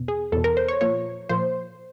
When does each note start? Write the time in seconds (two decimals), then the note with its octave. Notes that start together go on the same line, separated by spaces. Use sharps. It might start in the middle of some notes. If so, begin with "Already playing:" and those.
Already playing: E2 B2
0.08 G#4
0.32 E2 B2 A4
0.44 A#4
0.57 C5
0.68 C#5
0.81 A#2 F3 C#5
1.29 A#2 F3 C5